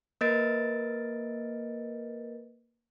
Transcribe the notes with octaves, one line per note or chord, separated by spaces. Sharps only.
A#3 A#4 B4 D#5 A6 D7